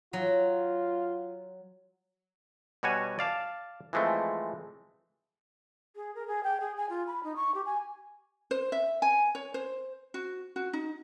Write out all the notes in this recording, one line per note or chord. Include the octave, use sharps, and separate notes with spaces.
F#3 F4
B2 G3 F#4 C#5 G#5
D5 F5 A5
E3 F3 G#3 A3 C4
G#4
A#4
G#4
G5
G#4
G#5
F4
B5
D#4
C#6
G4
G#5
C5
E5
G#5
C#5
C5
F#4
F#4
D#4